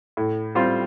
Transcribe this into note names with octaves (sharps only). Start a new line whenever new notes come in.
A2
G3 C4 F4 C5